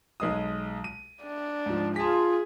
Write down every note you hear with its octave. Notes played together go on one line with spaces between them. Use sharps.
B1 G#3 D#6
D#7
D4
G#2 F3
F4 G#4 A5 B6